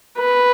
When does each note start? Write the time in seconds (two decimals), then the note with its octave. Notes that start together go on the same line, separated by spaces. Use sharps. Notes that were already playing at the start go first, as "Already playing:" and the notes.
0.18 B4